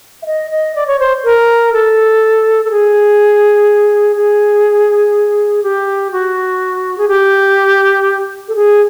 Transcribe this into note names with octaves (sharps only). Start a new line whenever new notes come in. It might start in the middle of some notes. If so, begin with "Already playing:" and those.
E5
D#5
D#5
D5
C#5
C5
A#4
A4
A4
G#4
G#4
G4
F#4
G#4
G4
A4
G#4